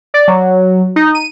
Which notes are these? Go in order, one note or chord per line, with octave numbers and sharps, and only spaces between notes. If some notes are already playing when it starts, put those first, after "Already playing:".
D5
F#3
D#4
D#7